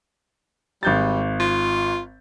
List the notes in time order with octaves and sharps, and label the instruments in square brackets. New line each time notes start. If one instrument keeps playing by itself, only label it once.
[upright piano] G#1 G6 A6 [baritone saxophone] G3
[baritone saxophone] F4